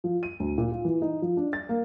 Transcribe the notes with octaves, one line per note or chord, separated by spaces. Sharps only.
F3
D#7
D2
A#2
F4
E3
D#4
F3
D4
A6
A#3